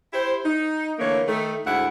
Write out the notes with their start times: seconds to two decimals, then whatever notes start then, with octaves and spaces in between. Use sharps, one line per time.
0.12 E4 G4 C5
0.44 D#4
0.99 D3 E3 A3 A#3 C#5
1.25 D#3 A3
1.65 D2 G#2 E4 F#5